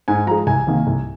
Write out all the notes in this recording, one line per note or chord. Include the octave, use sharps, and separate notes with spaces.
G#2 G#5
F3 G#3 A#5
C2 G#5
C3 D#3 A#3
C2